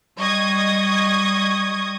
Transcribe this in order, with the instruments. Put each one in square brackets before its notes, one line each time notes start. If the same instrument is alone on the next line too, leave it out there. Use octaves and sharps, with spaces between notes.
[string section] G3 D#5 C#6 D#6 G#6